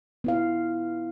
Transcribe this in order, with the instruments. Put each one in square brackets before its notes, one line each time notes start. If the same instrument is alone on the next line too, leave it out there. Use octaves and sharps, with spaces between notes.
[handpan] B3 E4 F5